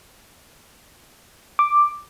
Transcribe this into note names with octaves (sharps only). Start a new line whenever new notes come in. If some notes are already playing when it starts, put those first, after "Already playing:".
D6